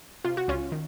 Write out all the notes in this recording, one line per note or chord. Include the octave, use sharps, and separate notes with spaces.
C3 F4
F#4
C#2 C#4 F4
D#3